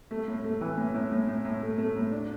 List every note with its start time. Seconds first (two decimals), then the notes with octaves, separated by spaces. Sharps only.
0.11 A3
0.28 A2
0.44 A3
0.61 E3
0.77 A2
0.94 A2
1.12 A2
1.29 A2
1.45 A2
1.62 A3
1.78 A3
1.96 A2
2.12 D4